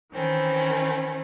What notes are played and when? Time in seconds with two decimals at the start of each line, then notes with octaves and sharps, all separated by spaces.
0.13 D#3 E3 C4 C#4